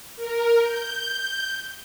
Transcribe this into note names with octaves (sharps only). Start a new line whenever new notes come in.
A#4
G6